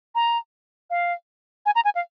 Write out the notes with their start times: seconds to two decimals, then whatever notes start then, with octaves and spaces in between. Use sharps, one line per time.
0.15 A#5
0.90 F5
1.66 G#5
1.75 A#5
1.85 G#5
1.95 F5